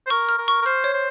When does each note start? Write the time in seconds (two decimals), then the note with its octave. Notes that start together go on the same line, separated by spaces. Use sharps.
0.07 C5
0.10 A#4 C#6
0.29 F6
0.38 A#4
0.48 C#6
0.62 A#4
0.66 C5 F6
0.84 C#5
0.94 C5